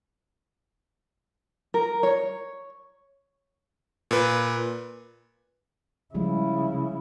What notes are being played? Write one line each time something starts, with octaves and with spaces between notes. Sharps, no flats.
A#4
C#5
A#2 B4
C#3 F3 G3 G#3 E4